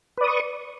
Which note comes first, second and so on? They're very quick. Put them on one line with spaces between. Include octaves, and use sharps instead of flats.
B4 D5 D#6 C#6